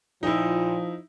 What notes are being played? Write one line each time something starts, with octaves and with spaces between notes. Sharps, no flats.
A#2 F3 D#4 E4